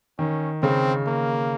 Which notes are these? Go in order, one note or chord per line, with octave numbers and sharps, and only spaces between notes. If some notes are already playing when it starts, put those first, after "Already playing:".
D#3 C#4
C#3 C4
A#3